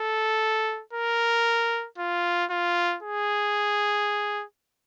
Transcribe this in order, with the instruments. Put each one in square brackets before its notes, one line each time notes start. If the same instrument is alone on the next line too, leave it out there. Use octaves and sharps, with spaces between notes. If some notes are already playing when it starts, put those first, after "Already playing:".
Already playing: [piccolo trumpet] A4
A#4
F4
F4
G#4